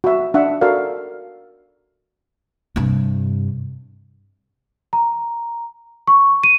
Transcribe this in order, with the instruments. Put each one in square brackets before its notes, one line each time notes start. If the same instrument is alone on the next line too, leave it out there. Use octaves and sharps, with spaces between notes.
[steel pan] F#4 E5
D4 E5 F#5
F#4 A4 A#4 D5 F5
[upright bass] G2 C3
[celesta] A#5
C#6
D#7